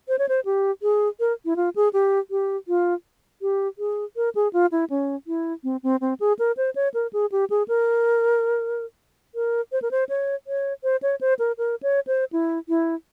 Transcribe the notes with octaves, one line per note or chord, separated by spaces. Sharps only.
C5
C#5
C5
G4
G#4
A#4
E4
F4
G#4
G4
G4
F4
G4
G#4
A#4
G#4
F4
E4
C#4
E4
C4
C4
C4
G#4
A#4
C5
C#5
A#4
G#4
G4
G#4
A#4
A#4
C5
A#4
C5
C#5
C#5
C5
C#5
C5
A#4
A#4
C#5
C5
E4
E4